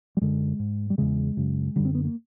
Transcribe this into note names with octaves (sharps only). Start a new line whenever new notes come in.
G3
F#2 D3 G#3
G#2
G3
E2 C#3 G#3
F#2 C#3
F#2 D3 G3
C4
B3
A#3